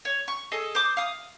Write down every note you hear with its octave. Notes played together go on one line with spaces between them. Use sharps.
C#5
C#6
G#4 A4 D#5
C5 D6 D#6
F5 D#6